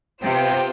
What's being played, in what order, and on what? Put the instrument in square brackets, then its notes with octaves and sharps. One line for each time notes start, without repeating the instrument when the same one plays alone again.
[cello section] C3 [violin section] B3 F4 C5 G5